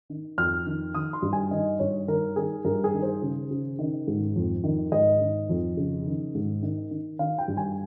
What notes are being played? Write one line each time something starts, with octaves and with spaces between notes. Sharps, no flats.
D#3
F2 F6
D#3
D#3 D#6
C6
G2
G#5
D#3 D#5
G2 C#5
D#3 A#4
D#3 G#4
G2 A#4
G#4
D#3
C5
C#3
C#3
D#3
G#2
F2
D#3
G#2 D#5
D#3
F2
C#3
D#3
G#2
D#3
D#3
D#3 F5
G5
G2
G#5